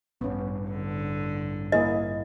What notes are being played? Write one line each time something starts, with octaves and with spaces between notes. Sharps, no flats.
A1 G2 B3 C#4
D3
A#3 E4 G#4 D#5